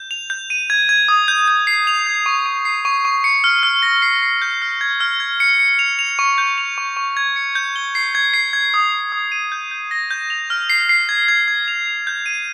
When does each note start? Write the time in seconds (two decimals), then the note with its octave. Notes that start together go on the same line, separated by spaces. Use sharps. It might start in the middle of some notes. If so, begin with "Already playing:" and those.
Already playing: G6
0.11 F7
0.30 G6
0.50 D#7
0.70 G#6
0.89 G#6
1.08 D#6
1.28 G6
1.48 G6
1.67 C7
1.87 F7
2.07 G#6
2.26 C#6
2.46 C#6
2.65 C7
2.85 C#6
3.05 C#6
3.24 C#7
3.44 F6
3.63 F6
3.82 A#6
4.02 C7
4.22 C7
4.42 G6
4.62 F6
4.81 G#6
5.00 F6
5.20 G#6
5.40 C#7
5.59 C#7
5.79 F7
5.99 F7
6.19 C#6
6.38 G6
6.58 F7
6.78 C#6
6.97 C#6
7.17 G#6
7.36 C#7
7.55 G6
7.76 G7
7.95 C7
8.15 G#6
8.34 C7
8.53 G#6
8.74 D#6
8.92 D#6
9.12 D#6
9.32 D#7
9.52 G6
9.71 G6
9.91 A#6
10.11 G6
10.30 F7
10.50 F6
10.70 C7
10.89 C7
11.09 G#6
11.28 G#6
11.48 G#6
11.68 F7
11.87 F7
12.07 G6
12.26 D#7